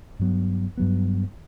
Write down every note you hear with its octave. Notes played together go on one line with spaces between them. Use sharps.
G2 F#3 B3
G2 F#3 B3